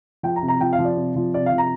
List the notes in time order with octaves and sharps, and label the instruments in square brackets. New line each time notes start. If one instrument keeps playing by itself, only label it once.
[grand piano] F3 G5
A#5
C3
A#5
F3 G5
F5
F3
D5
C3
F3
C3 D5
F5
F3
A#5